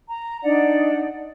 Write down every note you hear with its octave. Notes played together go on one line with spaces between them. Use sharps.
A#5
D4 D#4 D5 F#5